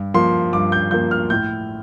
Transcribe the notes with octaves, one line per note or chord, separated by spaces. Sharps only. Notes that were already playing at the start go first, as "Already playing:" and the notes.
Already playing: G2
F3 A#3 C6
G2 D6
G6
F3 A#3 G6
F6
A2 G6